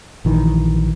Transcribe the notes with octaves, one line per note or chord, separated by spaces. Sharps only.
A#1 D#3 E3